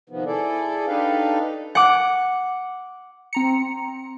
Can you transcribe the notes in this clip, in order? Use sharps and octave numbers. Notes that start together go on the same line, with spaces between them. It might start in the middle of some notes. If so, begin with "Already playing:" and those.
C3 D#3 F3 B3
E4 G#4 A4 D5
D4 D#4 G4 A4 B4 F5
F#5 D6
C4 A#5 C#7